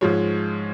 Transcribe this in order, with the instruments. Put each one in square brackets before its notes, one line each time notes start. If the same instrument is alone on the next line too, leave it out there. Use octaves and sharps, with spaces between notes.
[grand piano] G#2 F3 G#3 C#5